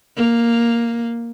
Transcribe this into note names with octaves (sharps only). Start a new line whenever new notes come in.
A#3